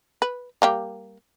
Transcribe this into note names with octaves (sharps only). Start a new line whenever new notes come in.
B4
G3 A#3 G4